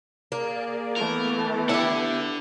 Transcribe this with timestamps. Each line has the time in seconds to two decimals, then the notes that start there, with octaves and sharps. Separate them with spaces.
0.32 A#3 G#4 A#4 D5
0.96 E3 A3 B3 A#4 D6
1.69 D3 E4 G4 F#5